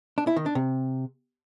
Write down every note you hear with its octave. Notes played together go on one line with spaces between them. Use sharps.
D4
E4
D#3
D4
C3